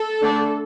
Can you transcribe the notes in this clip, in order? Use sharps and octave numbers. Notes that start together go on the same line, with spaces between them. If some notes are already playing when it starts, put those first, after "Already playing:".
Already playing: A4
D3 A3 D4